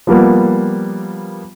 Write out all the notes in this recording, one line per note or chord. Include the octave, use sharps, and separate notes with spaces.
F3 G3 A#3 B3